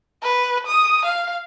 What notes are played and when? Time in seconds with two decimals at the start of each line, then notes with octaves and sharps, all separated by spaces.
0.23 B4
0.67 D#6
1.05 F5